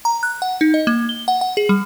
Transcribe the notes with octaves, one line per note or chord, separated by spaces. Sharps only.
A#5
F#6
F#5
D#4
D#5
A#3
G7
F#5
F#5
G#4
G3